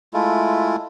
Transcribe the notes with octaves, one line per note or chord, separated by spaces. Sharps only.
G#3 A3 E4 F4